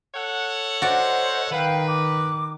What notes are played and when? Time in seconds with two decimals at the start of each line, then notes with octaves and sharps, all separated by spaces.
0.15 A4 C#5 F#5
0.82 F#4 C5 D5 D#5
1.52 D#3 B4 F5 G5
1.87 D6